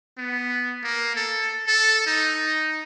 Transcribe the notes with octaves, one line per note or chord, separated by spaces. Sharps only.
B3
A#3
A4
A4
D#4